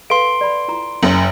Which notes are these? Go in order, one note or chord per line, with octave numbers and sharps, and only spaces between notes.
A4 B4 F5 C6 D7
D5 B5
E4 F4 A#5
F#1